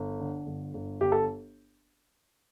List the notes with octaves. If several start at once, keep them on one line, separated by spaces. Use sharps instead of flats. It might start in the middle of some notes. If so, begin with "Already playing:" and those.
Already playing: G1
D3
G1
G1
G1 G4
A4